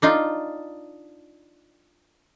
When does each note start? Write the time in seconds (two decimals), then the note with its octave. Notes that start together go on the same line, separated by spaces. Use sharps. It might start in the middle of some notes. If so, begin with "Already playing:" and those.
0.02 D4 D#4 F4